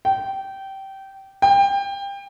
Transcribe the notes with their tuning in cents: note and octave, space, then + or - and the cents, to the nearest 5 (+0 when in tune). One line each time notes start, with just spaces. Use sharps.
G5 -20
G5 +25